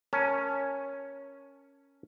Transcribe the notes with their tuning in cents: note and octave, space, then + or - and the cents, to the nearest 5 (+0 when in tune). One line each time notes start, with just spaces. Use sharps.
C#4 +0 A#4 +0 A5 +0